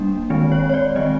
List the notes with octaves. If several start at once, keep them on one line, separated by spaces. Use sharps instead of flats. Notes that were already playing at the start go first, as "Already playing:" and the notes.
Already playing: G3 A#3 D4
D#3 G#3 C4
C#5
C#5
D5
D#3 G#3 C4 D#5